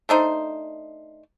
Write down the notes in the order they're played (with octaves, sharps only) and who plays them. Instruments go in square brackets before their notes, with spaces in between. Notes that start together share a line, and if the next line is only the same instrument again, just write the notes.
[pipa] A3 D4 D#4 C5